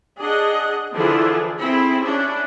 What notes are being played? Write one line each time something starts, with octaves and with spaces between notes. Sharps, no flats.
D4 G#4 D#5 F#5
D3 E3 F3 E4 F4 G#4
C4 E4 G#4
C#4 D4 E4